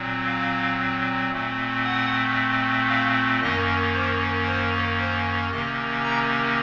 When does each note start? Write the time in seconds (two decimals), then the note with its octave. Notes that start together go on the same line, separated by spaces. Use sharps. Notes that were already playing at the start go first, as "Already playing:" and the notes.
Already playing: A#2 F#3 C4
0.27 F5
1.31 A#2 A3 C4
1.84 F#5
2.89 F5
3.41 F#2 D#3 A#3 C#4 D#5
3.94 C5
4.46 C5
4.99 C5
5.51 C3 D#3 A#3 C#4 D#5
6.03 A#5